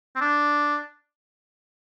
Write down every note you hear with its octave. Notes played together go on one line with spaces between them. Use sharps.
C4
D4